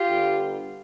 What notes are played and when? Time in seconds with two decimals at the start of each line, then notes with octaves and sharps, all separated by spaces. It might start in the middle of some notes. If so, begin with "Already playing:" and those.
Already playing: F4 G4
0.08 D3 G3 B3